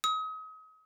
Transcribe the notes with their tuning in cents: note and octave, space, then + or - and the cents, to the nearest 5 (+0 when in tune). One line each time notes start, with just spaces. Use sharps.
D#6 +35